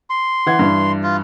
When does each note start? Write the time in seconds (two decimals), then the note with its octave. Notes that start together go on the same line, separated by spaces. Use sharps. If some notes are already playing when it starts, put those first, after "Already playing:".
0.10 C6
0.46 E3 F#5 G#6
0.59 G2 E3
1.03 F4